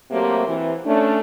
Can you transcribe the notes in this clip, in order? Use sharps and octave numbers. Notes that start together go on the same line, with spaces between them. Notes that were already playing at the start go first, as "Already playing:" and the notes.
C3 F#3 A3 A#3 G4 C5
C3 E3
A3 C#4 D4